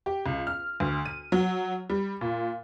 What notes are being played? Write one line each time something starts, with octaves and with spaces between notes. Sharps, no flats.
G4
C#2
F6
D2
D#7
F#3
G3
A#2